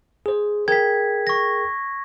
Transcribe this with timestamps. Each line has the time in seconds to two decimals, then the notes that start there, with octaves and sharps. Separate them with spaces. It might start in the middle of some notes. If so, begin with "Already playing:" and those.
0.26 G#4 C5
0.68 G#4 A#4 G5 G#6 B6
1.27 C#6 A#6